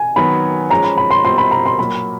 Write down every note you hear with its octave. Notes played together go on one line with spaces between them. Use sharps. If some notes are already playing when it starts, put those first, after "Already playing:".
Already playing: G#5
D#3 F#3 B3 B5
F3 G#3 C#4 A#5
B5
B5
C6
B2 G3 C4 F4 C6
B5
A#5
C6
A#2 F#3 A#3 B5